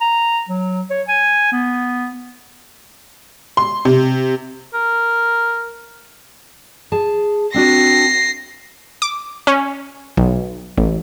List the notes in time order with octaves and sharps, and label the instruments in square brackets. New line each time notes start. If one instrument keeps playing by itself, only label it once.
[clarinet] A#5
F#3
C#5
G#5
B3
[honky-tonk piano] C6
C3
[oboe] A#4
[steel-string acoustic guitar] G#4 A5
[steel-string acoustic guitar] C4 D4 F#4 [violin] A#6 C7
[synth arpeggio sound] D6
C#4
B1
A1